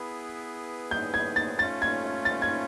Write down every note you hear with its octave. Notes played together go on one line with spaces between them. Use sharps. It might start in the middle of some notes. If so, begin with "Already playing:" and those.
Already playing: B3 E4 G#4 B4
G6
G#6
A6
A3 C#4 F4 A6
G#6
A6
G#6